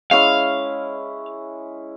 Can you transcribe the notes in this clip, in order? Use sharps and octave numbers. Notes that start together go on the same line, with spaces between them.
G#3 C#4 E4 F5